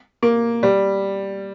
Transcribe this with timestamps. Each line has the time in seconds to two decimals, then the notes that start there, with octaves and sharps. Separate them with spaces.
0.23 A#3
0.63 G3